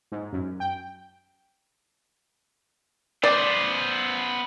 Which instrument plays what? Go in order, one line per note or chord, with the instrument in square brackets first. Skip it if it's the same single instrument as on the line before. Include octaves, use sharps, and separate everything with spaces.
[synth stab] G#2
F#2
G5
[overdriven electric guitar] B3 C5 [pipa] D5